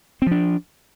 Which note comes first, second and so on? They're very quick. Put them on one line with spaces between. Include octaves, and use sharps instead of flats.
C4 F3 D4